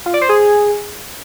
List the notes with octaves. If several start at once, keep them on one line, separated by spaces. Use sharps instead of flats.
F4
D5
C5
G#4